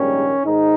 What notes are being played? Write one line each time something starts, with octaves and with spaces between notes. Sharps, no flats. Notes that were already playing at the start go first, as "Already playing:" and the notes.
Already playing: A#1 G#2 D#3 G3 A#3 C#4
G#2 D#3 D#4